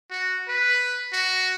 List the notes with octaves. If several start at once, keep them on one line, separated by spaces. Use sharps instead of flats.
F#4
B4
F#4